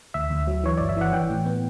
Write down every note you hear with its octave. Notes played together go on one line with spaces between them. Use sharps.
D2 E5
D2
F#3
E3 C#5
G1 D5
E5
E3 F#5
E3 G5
A2
B3